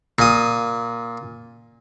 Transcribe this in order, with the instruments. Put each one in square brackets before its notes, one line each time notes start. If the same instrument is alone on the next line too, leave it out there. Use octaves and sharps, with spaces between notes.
[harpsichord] A#2 D#6